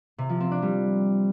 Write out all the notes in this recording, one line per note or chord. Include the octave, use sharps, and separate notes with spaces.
C3
F3
C4
D4
G3